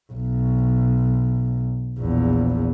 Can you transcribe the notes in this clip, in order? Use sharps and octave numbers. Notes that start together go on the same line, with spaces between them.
B1
A#1 E2